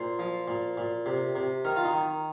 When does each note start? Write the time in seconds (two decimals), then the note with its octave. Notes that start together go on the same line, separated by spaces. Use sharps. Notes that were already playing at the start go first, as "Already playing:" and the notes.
Already playing: A#2 C5
0.19 F3
0.48 A#2
0.77 A#2
1.06 C3
1.35 C3
1.65 D#3 A#4
1.76 F4
1.85 D#4
1.94 D#3